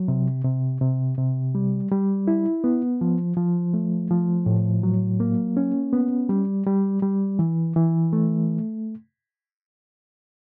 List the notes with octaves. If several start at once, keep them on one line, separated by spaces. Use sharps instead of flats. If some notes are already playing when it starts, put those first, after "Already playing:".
Already playing: F#3
C3
C3
C3
C3
G3
G3
E4
B3
F3
F3
A3
F3
A2
F#3
A#3
C#4
B3
G3
G3
G3
E3
E3
A3